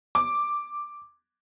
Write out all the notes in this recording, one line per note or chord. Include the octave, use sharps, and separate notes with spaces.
D6